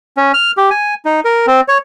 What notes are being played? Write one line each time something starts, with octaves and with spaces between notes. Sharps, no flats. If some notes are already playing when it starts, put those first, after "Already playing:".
C#4
F6
G4
G#5
D#4
A#4
C4
C#5